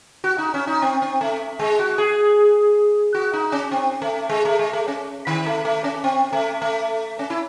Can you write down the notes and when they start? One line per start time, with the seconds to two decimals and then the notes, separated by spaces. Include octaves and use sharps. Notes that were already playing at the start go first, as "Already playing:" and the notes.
0.24 F#4
0.38 D#4
0.54 C#4
0.67 D#4
0.82 C4
1.02 C4
1.21 A3
1.59 G#3
1.79 F#4
1.98 G#4
3.14 F#4
3.33 D#4
3.52 C#4
3.71 C4
4.02 A3
4.29 G#3
4.45 A3
4.59 G#3
4.73 A3
4.88 C#4
5.27 D#3
5.46 A3
5.65 A3
5.84 C#4
6.04 C4
6.33 A3
6.62 A3
7.19 C#4
7.30 E4